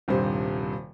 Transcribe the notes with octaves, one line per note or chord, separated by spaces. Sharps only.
D#1 G2 C3 C5